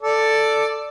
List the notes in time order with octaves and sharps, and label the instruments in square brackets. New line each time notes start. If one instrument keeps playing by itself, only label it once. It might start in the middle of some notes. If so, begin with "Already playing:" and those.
[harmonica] A4 D5